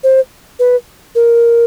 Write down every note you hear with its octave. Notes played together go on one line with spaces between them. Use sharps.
C5
B4
A#4